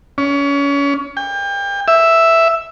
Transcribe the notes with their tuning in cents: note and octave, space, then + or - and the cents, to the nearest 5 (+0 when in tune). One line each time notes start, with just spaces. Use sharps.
C#4 +30
G5 +30
E5 +5